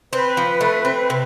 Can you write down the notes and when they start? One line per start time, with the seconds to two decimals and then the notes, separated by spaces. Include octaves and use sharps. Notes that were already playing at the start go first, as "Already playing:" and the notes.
0.12 C4 B4
0.37 F3
0.61 A3
0.85 C4
1.10 C3